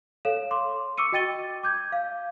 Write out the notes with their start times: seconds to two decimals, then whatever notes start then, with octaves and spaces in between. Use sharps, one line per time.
0.25 A4 C#5 F5 E7
0.51 C6 D6
0.98 C#6 D6 E6 C#7 D#7
1.12 F#4 D#5 G5 A6 D#7 G7
1.63 D6 G6 G#6
1.92 F5